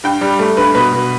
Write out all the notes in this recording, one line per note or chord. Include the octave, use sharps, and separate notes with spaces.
G2 G5
G3
A3
G2 B4
B2 B4
B2